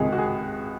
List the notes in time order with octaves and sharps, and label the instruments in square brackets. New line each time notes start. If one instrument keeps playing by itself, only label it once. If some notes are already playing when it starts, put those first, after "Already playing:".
Already playing: [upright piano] C#2 C3 D#3 G#3 G#4
F#4
G#4